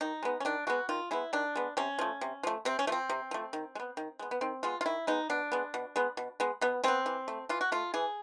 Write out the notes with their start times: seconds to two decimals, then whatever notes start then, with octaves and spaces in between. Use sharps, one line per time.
0.01 D#3 D#4
0.23 G#3 B3
0.40 C#4
0.45 D#3 D4
0.67 G#3 B3 F#4
0.89 D#3 F4
1.11 G#3 B3 E4
1.33 D#3 D4
1.55 G#3 B3
1.77 C3 C#4
1.99 F3 A3
2.21 C3
2.43 F3 A3
2.65 C3 C4
2.79 C#4
2.87 F3 A3 C4
3.10 C3
3.31 F3 A3
3.53 D#3
3.75 G#3
3.80 B3
3.97 D#3
4.19 G#3 B3
4.31 B3
4.41 D#3 C4
4.63 G#3 B3 F4
4.81 F4
4.86 D#3 E4
5.07 G#3 B3 D#4
5.30 B2 D4
5.52 G#3 B3
5.74 B2
5.96 G#3 B3
6.17 B2
6.40 G#3 B3
6.61 B2 B3
6.84 G#3 B3 C4
7.06 E3
7.28 A3
7.49 E3 F4
7.61 F#4
7.72 A3 F4
7.94 E3 G#4